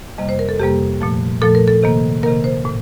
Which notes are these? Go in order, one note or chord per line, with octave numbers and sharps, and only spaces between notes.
F2 C3 G3 A#3 D#5
C5
A#4
A4
F2 C3 G3 A#3 G4
A#2 F3 A3
A#2 F3 A3 A4
A#4
A4
C3 D#3 A#3
C3 D#3 A#3 A#4
C5
A2